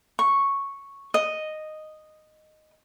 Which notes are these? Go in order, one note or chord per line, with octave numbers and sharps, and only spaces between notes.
C#6
D#5